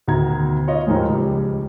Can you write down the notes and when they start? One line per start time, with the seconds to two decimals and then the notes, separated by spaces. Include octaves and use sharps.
0.08 D2 B2 D#3 A#5 G#6
0.67 F4 C#5 D#5
0.87 D#2 D#3 F3 G#3
1.09 C#2 G3